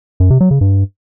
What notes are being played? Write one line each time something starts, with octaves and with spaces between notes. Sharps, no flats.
F#2
C3
F#3
C#3
G2